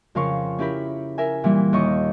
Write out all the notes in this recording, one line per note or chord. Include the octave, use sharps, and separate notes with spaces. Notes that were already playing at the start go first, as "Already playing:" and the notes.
F2 C#3 A#4 F5 C6 C#6
C#4 E4 G4 A#4 B5
A#4 E5 G#5
A#2 E3 G3
D#2 D#5 C#6